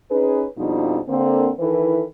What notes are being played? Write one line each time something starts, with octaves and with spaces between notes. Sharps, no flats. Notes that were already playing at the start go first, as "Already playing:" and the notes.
C#4 D#4 G#4 B4
F2 B2 F3 G3 D4 D#4
D3 A#3 C4
D#3 E3 E4 A4 B4